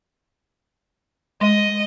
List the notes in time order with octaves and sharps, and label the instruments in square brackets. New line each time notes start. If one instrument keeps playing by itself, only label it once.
[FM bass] G#3 [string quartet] D#5